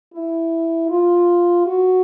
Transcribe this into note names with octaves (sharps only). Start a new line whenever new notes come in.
E4
F4
F#4